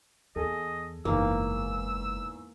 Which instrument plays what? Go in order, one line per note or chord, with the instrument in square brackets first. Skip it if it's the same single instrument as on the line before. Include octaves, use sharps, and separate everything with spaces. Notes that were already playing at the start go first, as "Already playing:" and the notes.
[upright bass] E2 [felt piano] G#4 A4 [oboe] D#5
[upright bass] F#1 G#3 [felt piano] E2 G#2 [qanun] A#3 [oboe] E6